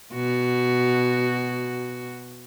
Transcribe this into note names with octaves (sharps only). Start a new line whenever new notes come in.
B2 F#4